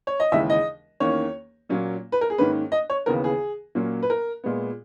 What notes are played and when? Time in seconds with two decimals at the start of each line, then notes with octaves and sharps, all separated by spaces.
0.07 C#5
0.20 D#5
0.32 D#2 C#3 E3 G#3 E5
0.50 D#5
1.00 E2 D#3 A#3 C#4 C#5
1.69 A#2 F#3 A#3 C#4
2.12 B4
2.21 A#4
2.30 G#4
2.38 G#2 D#3 A#3 C#4 B4
2.72 D#5
2.90 C#5
3.06 D#2 C#3 E3 B3 A#4
3.24 G#4
3.75 A#2 F#3 A#3 C#4
4.03 B4
4.10 A#4
4.44 A#2 G#3 B3